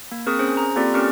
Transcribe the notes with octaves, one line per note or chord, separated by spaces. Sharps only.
A#3
C4 G#4 A#4 C#6 D#6
C#4 G#4 C5
A#5
A#3 C4 F4 G4 A4 D5
C#4 G4 A#4 C#6 F6